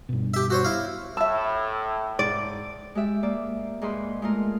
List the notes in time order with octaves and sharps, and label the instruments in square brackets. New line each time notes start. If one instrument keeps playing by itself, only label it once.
[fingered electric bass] G2 B2
[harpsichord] G4 E5
F#4 C5 C#5
E4 F5
[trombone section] A2 [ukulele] E5 A5 [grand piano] E6
[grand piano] G#2 [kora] D5
[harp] G#3 G4 E5
A#3 D5
G#2 A#3 G#4 B4 C6
G#3 A3 F4 A#4